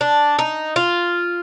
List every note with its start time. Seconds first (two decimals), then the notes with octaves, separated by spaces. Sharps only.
0.01 D4
0.39 D#4
0.76 F4